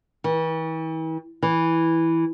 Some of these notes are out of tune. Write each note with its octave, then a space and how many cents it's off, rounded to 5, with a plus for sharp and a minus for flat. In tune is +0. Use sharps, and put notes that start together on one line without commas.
E3 -40
E3 -5